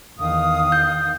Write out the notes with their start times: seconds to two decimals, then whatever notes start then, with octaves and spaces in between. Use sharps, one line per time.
0.19 E2 D#3 F5 D#6
0.72 G6